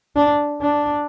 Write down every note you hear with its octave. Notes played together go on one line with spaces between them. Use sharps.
D4
D4